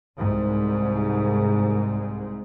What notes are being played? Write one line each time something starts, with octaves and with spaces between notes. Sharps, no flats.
C2 G#2